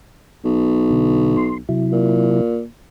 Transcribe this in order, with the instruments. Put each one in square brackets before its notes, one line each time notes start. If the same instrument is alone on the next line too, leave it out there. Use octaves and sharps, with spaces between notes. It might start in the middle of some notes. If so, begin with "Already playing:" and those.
[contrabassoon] B1
[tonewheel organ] B2 D3
C6
C3 F#3 E4
[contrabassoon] A#2